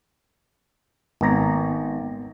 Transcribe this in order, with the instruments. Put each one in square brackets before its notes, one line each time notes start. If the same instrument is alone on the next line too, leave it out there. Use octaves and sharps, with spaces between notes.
[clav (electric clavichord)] G#1 A#5 [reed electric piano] A#3 B3